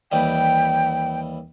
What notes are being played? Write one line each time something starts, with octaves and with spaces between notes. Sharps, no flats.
D#2 E3 G3 G5